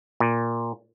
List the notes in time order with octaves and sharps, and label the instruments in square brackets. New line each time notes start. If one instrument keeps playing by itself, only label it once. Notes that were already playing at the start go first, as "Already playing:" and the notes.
[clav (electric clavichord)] A#2